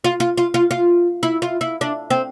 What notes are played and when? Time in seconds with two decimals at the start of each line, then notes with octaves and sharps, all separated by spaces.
0.04 F4
0.20 F4
0.38 F4
0.54 F4
0.71 F4
1.23 E4
1.42 F4
1.61 E4
1.81 D4
2.10 C4